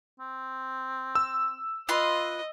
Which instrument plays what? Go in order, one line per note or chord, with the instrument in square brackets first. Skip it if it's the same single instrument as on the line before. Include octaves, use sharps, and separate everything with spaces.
[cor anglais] C4
[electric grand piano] E6
[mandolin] F4 B4 C6 [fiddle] D#5